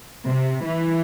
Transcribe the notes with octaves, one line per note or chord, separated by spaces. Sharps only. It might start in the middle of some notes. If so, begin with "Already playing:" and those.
C3
E3